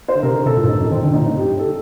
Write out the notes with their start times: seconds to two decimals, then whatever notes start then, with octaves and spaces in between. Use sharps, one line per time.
0.08 C5
0.15 D3
0.23 C3 A#4
0.35 D3
0.46 C3 A4
0.57 A#2
0.64 G2
0.68 A2 D#4
0.80 F#2
0.91 D#3 C4
1.03 D3
1.14 A#2 D#4
1.25 A2
1.37 G2 G4
1.48 G2
1.59 A4